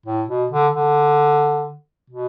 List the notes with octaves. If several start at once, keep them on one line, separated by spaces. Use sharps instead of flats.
A2
B2
D3
D3
B2